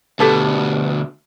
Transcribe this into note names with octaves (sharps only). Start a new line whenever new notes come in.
D2 B2 G4 A4 B4